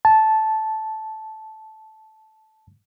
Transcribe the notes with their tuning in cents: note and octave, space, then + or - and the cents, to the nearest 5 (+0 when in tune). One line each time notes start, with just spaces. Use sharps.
A5 -10